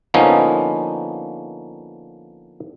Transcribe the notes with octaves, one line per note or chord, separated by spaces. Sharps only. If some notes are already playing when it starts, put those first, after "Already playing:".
D3 F3 A#3 B3 C#4 D#4